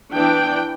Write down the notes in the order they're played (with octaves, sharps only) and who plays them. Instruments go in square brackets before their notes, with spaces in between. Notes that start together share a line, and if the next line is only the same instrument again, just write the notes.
[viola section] E3 B3 D4 G5